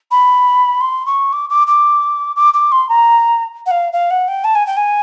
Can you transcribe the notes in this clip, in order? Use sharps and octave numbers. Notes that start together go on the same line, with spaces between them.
B5
C6
C#6
D6
D6
D6
D6
D6
C6
A#5
F#5
F5
F5
F#5
G5
A5
G#5
G5
G#5